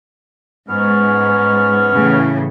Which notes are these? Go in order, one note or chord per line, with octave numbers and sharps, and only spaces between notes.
G#2 B3 C#4 F6
A2 C#3 E3